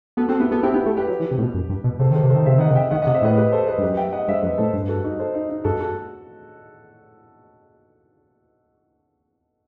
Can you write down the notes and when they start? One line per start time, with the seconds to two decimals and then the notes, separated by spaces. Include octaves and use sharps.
0.17 B3 F#4 A4
0.28 C4 F#4 A4
0.39 B3 E4 G4
0.51 B3 F#4 A4
0.63 C4 E4 G4
0.74 B3 E4 G4
0.86 A3
0.97 G3 G4 B4
1.08 F#3
1.20 E3
1.31 C3
1.38 A2
1.43 B2
1.54 F#2
1.69 G2
1.84 B2
1.99 C3 A4 C5
2.11 D#3 A4 C5
2.23 C3
2.30 D#3 A4 C5
2.46 C3 C5 E5
2.58 D#3 D#5 F#5
2.68 C3 F#5
2.75 E5 G5
2.91 D#3 D#5 F#5
3.02 D#5 F#5
3.06 C3
3.14 C5 E5
3.22 A2 B4 D#5
3.37 G4 B4
3.52 A4 C5
3.67 B4 D#5
3.78 G2
3.82 F#2 G4 B4
3.97 E5 G5
4.12 D#5 F#5
4.28 G2 C5 E5
4.42 F#2 B4 D#5
4.58 A2 A4 C5
4.73 G2
4.80 B4
4.89 F#4 A4
5.04 D#4 F#4
5.20 A4 C5
5.34 D#4
5.50 D#4
5.64 G2 F#4 A4
5.80 F#4 A4